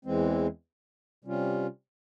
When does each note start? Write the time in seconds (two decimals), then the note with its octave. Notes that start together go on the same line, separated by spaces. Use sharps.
0.05 E2 E3 G#3 C4
1.25 C3 G3 C#4 F4